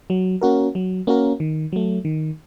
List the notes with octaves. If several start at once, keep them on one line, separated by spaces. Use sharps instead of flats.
F#3
A#3 C#4 F#4 A#4
F#3
A#3 C#4 F#4 A#4
D#3
F#3 A3
D#3